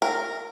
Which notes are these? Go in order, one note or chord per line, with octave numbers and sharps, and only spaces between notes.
A#4